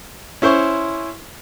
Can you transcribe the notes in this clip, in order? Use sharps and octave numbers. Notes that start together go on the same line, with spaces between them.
C#4 E4 C5 C6 C#6